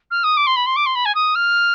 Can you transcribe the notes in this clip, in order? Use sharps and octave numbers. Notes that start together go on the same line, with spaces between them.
F6
D#6
D6
C6
B5
C6
D6
C6
B5
G#5
D#6
F6